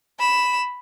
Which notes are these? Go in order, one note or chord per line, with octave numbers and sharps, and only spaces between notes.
B5 E7